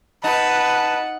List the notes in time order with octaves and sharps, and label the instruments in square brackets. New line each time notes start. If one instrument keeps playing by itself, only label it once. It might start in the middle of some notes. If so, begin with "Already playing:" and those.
[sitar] D#4 [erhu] B4 [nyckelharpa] F#5 [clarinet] A5